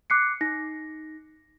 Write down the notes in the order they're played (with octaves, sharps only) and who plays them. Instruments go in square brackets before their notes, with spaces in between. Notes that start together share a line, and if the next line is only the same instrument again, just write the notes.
[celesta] D6 F#6 C7 C#7
D#4 A#6